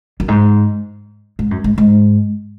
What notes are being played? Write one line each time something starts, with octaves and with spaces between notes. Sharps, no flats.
F#2
G#2
G#2
F#2
G#2
G#2